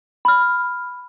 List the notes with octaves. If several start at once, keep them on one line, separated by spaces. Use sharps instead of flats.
B5 F6